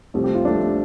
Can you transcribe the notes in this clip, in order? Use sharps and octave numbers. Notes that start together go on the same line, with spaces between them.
C2 C3 F3 A3
G4
F4
C2 C3 F3 A3 D4